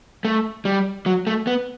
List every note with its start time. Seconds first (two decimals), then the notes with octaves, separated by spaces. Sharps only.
0.25 A3
0.65 G3
1.06 F#3
1.27 A3
1.47 B3